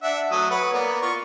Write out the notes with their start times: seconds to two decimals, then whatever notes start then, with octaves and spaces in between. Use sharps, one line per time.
0.03 D4 E5 F#5
0.31 F#3 A3 D#6
0.50 B4 C#5 F#5
0.73 A#3 B3 D5
1.02 F4 C#6